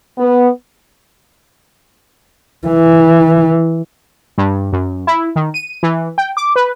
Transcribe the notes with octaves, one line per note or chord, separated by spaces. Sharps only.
B3
E3
G2
F#2
E4
D#3
D#7
E3
G5
D6
B4